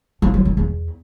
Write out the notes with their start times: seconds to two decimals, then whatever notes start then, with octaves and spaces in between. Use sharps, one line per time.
0.22 F3
0.34 F#3
0.45 D3
0.57 E2